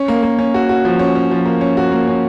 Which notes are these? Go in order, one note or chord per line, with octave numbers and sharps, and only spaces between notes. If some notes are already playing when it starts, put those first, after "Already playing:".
Already playing: C#4
A#3
A#3
C#4
F#4
F#4
F3
C#4
C#4
F3
A#3
C#4
F#4
A#3
C#4